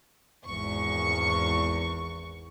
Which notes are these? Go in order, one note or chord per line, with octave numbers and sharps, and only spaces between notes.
G#1 E2 C#6